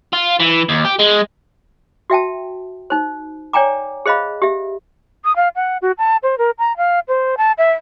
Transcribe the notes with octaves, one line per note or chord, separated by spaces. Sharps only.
F4
E3
D#2
G4
G#3
F#4 E5 G5 A5
D#4 C5
C#5 D5 G5 G#5 A#5 D6
G#4 C5 D#5 F5 B5
G4 E5
D#6
F5
F#5
F#4
A5
C5
A#4
A#5
F5
C5
A5
E5